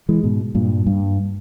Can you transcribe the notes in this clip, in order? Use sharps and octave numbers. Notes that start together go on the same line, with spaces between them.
E3 G#3
G#2 B2
G2 A#2
G2